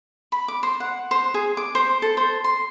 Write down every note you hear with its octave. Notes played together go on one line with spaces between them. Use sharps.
B5
D6
C5
F#5
C5
G#4
D6
C5
A4
C5
C6